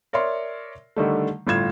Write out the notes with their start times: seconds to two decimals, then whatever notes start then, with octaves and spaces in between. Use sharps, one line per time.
0.13 A#4 C#5 D5 E5 C6
0.96 D3 D#3 G3 A3
1.47 G1 A2 F4 G#6 E7